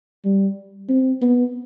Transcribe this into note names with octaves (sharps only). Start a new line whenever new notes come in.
G3
C4
B3